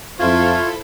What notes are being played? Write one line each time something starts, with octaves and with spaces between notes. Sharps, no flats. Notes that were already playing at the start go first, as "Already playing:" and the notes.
F2 E4 F4 A4 C5 E5 C#6 G#6